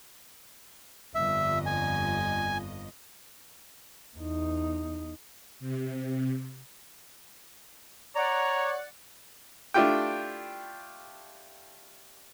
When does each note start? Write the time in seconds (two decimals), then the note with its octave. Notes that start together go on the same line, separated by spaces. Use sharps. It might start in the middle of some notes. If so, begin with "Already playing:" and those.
1.15 G1 F2 D#5 E5
1.66 G#5
4.17 E2 D#4
5.60 C3
8.16 C#5 D5 F#5 A#5
9.74 A3 D4 E4 F4 G4 G5